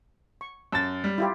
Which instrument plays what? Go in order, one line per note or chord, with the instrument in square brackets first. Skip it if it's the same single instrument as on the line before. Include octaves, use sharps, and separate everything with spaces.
[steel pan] C#6
[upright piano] F#2 A6 [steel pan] A5 E6
[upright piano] G3
[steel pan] E4 F4 G4